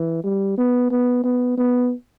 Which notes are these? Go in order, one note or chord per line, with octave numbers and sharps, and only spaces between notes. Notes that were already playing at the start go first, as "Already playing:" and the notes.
Already playing: E3
G3
B3
B3
B3
B3